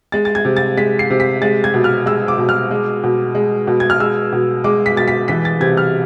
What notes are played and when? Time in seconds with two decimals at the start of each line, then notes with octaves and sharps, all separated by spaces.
0.12 G#3 A6
0.25 A6
0.35 G#6
0.45 C3
0.57 A6
0.77 G#3 B6
0.99 C7
1.10 C3
1.20 B6
1.42 G#3 A6
1.64 G#6
1.74 B2
1.84 F6
2.06 G#3 E6
2.28 D6
2.38 B2
2.49 F6
2.71 G#3
3.04 B2
3.35 G#3
3.67 B2
3.80 G#6
3.90 F6
4.00 G#3 E6
4.32 B2
4.64 G#3 D6
4.86 B6
4.97 B2 A6
5.08 B6
5.28 E3 B6
5.45 A6
5.61 C3 G#6
5.77 F6